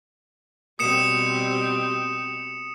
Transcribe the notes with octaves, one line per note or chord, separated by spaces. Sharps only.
B2 G3 C4 D#6 C#7 E7